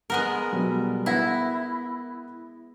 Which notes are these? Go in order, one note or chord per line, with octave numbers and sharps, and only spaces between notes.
G#3 B3 A#4
B2 F#3 G3
B3 E4 F#5 A#6